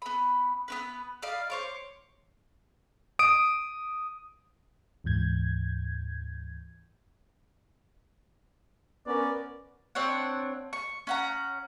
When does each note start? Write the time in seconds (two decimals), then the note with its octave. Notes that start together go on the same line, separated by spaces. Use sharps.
0.02 B3 B5
0.68 B3 C#4 B4
1.22 D5 D#5 F5 B5
1.50 C5 C#5 D6
3.19 D#6 D7
5.04 D2 G#2 E3 G6 G#6
9.07 B3 C#4 A#4 D5
9.95 C4 D4 C#5 F#5
10.73 C#6
11.07 C#4 F#5 A#5